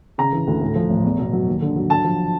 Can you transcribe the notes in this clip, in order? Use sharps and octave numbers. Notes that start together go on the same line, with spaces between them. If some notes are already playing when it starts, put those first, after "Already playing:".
C#3 A#5
E3
D2
A2
F3
A1
E2
B2
F#3
D#2
D3
F#3
D3 A5
F3